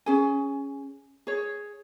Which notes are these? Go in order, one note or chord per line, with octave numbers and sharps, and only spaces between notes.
C#4 G#4 G#5
G#4 C#5